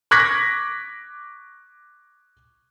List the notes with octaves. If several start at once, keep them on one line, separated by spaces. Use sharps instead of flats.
C#6 D6 F#6 G#6 A#6 B6